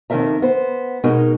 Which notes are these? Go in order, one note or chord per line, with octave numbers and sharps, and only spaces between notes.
F2 D#3 E3 A#4 E5 A#5
B3 C5
B2 G#3 D#4 A#4